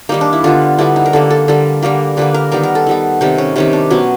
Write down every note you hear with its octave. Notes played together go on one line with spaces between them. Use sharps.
D#3 G3 A#3 D#4
D4
E4
D3 G3 B3 F4
D3 G3 B3 E4
D#4
A#4
D3 G3 A#3 A4
A4
D3 G3 A#3 A4
D3 G3 A#3 A#4
D3 G3 A#3 B4
A#4
D#3 G3 B3 A#4
A#4
A4
D#3 G3 B3
C3 D#3 G3 D#4
C#4
C3 D#3 G3 C#4
D4
B2 F#3 B3 C#4